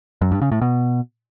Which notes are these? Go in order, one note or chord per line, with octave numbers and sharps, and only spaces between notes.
F#2
G2
C#3
A2
B2